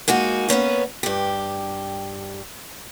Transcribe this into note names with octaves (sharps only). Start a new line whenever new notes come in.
G#3 A#3 D#4 F#4
A#3 B3 C#4 B4
G2 G4